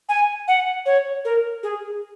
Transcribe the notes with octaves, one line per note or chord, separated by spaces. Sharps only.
G#5
F#5
C#5
A#4
G#4